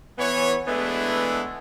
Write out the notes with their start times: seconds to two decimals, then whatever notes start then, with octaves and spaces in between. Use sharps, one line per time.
0.19 E3 B3 C#5
0.68 E3 G#3 A3 B3 D4 E4